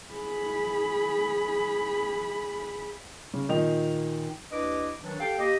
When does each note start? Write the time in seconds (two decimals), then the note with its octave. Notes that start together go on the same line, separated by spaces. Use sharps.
0.14 G#4 B5
3.34 C#3
3.49 A#2 D#3 D#4 F7
4.51 D#2 D4 E4 B4 D#5 D6
5.02 D#3 E3 F#3 D4
5.20 G4 A4 F5 G5
5.39 A#3 G4 D#5